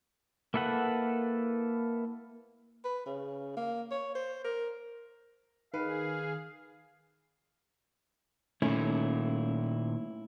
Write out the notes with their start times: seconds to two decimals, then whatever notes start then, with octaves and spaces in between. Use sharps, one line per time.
0.54 A#3 E4 A4 B4 F#5
2.84 B4
3.06 C#3
3.56 A#3
3.91 C#5
4.15 C5
4.44 A#4
5.74 D#3 G#4 B4 F5
8.62 A#2 D#3 A3 C#4 E4